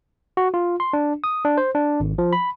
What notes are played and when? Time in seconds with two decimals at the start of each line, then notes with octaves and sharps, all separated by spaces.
0.37 F#4
0.54 F4
0.80 C6
0.93 D4
1.24 D#6
1.45 D4
1.58 C5
1.75 D4
2.00 G#1
2.18 F3
2.33 B5